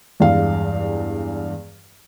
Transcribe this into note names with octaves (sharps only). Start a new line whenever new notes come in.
E2 G2 G#3 F5